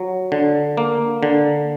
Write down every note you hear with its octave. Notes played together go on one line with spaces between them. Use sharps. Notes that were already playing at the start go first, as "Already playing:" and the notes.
Already playing: F#3
D3
A#3
D3